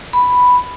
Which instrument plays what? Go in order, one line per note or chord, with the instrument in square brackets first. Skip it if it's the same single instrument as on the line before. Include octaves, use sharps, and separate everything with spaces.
[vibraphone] B5